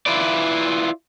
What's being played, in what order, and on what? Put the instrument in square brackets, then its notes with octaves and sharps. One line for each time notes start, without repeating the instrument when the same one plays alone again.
[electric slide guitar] E4 F4 B4 D5